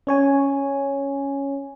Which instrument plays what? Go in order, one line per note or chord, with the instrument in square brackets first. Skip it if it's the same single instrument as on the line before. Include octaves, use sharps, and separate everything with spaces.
[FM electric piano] C#4 C#5 G#5